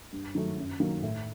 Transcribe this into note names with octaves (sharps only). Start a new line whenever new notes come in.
G2
D#3 F#3 A3
F#2
D#3 F#3 A#3
A2